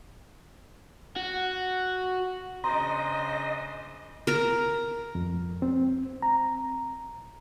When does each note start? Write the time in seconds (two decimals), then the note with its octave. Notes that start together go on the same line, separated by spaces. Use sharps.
1.16 F#4
2.64 C#3 D4 C5 D#5 A#5 C6
4.27 A#4 A#5
5.15 F2
5.62 C4
6.22 A#5